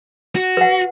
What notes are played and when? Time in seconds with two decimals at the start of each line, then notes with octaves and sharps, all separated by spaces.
0.35 F#4
0.57 B4 F#5